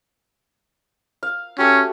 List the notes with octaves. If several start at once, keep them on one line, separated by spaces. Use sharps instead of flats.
F5
A3 C#4 F#4 G4